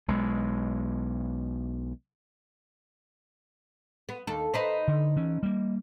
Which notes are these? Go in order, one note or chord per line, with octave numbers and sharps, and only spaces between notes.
B1 G#3
B3
D#2 A4
D#4 B4 C5
D3
E3 C#4
G3 A#3